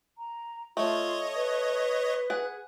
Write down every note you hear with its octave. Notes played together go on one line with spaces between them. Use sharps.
A#5
A3 F4 C#5 D#5
B4
G#4 F#5